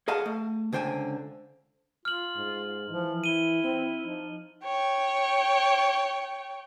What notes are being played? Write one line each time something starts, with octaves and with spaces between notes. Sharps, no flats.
G#4 A4 D#5 F5 F#5 A5
A3
C#2 D3 C5 G5 G#5
F4 F6 F#7
G#2
E3 F3
E4 D#7 G7
C4 G7
F3 D#4
C#5 G5